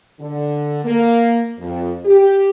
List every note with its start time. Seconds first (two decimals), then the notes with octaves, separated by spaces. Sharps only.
0.20 D3
0.85 A#3
1.58 F2
2.06 G4